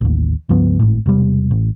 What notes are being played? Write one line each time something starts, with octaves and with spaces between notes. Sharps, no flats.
A1 D#2
C#2 G2 F3 B3
G#1 A2
E1 C3 G3
A1